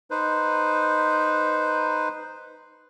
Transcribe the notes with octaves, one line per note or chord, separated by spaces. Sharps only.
D#4 B4 C5